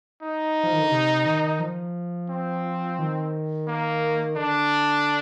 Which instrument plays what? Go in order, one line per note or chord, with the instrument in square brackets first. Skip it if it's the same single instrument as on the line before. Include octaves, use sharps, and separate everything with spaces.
[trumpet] D#4
[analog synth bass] F3
D#3
D3
C3
D#3
F3
[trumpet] C4
[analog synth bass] D#3
[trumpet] A#3
[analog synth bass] D3 [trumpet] D4